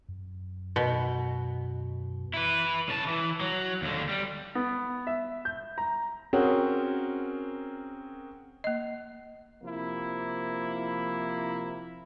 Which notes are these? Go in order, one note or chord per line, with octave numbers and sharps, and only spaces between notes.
F#2
B2
E4 B4
C#3 A5
E3
F#3
D#2 D3
G3
B3
E5
G6
A#5
C4 C#4 F#4 G#4 A#4
A#3 D#5
C3 F3 A#3 E4